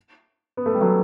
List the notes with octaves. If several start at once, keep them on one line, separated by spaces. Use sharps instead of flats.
B3
A3
G3
F#3 A3